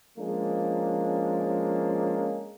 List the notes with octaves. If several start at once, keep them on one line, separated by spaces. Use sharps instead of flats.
F3 G#3 A#3 C#4 D4